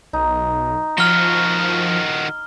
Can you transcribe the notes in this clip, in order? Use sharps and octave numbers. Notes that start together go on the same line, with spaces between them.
B1 D#4
D#3 F3 F#4 F6 G7